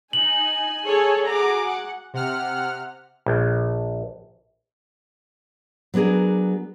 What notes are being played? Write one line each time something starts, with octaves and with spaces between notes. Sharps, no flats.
D#4 G#5 F#7
G#4 A4 C#5
F#4 G#4 A#5 D6
F#5
C3 F#5 F6
A#1
F#3 B3 D4 G#4 A#4